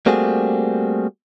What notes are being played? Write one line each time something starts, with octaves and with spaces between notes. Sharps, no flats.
G3 A3 A#3 C4 F#4 G#4